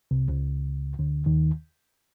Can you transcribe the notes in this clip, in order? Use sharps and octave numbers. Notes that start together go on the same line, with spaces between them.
C2 C3
C#2 C#3
D2 D3
D#2 D#3